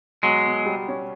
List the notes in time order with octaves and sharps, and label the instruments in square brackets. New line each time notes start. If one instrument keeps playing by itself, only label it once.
[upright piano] B2 [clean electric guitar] F#3 G#3
[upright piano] B2
G3
C#4